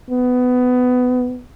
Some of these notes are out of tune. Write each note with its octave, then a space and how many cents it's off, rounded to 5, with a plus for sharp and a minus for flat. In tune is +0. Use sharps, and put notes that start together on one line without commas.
B3 +20